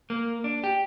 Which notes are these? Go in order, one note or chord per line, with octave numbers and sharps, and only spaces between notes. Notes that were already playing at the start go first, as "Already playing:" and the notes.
A#3
D4
G4